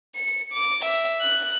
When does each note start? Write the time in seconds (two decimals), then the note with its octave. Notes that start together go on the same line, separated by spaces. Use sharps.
0.15 C#7
0.53 D6
0.85 E5
1.21 F#6